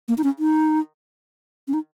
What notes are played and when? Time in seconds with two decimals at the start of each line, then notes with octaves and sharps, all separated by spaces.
0.08 A#3
0.18 D#4
0.24 C#4
0.39 D#4
1.68 C#4
1.74 D#4